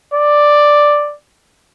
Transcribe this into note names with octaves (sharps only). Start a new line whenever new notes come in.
D5